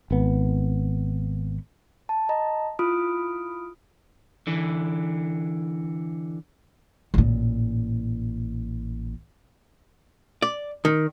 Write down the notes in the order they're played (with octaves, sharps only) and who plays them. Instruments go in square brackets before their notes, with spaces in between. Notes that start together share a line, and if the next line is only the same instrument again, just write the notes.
[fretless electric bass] G#1 B3
[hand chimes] A5
D#5 A5 A#5
E4 F4 B5 D#6 F6 D7
[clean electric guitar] D3 E3
[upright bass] A1 A#2
[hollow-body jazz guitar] D5
D#3